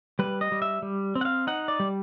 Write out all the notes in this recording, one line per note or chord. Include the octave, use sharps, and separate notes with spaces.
G3 B4
D#5
G3
E5
G3
C4
F#5
F5
D#4 F#5
D5
G3